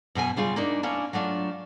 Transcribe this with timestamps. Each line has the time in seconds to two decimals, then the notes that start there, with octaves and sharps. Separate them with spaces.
0.15 F#2 B2 G#4 G#5
0.37 C#3 G3 F4 G#4
0.56 A#3 D4 D#4
0.83 A#3 C#4 D4 E4
1.13 F#3 A3 D4 F4